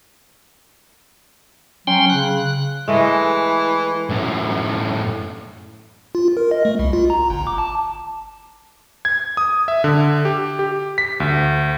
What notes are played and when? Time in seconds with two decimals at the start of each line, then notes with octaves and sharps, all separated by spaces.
1.87 F#3 C#4 G5 C6
2.10 C#3 F#6
2.88 E3 G#3 A3 D#5
4.10 F#2 A2
6.15 F4
6.37 A#4
6.51 D#5
6.65 A3
6.79 C2
6.93 F4
7.10 A#5
7.30 G1
7.47 D6
7.58 A5
9.05 G#6
9.37 D#6
9.68 E5
9.84 D3
10.25 G4
10.59 G4
10.98 B6
11.20 D2